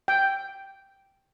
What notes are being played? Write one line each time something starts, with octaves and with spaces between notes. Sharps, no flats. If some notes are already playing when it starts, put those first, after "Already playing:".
G5